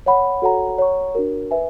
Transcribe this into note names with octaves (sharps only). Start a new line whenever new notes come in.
C#5 F#5 B5
F#4 A4 C#5 F#5 A#5
C#5 F#5 A#5 C#6
D4 F#4 A#4
B4 E5 G#5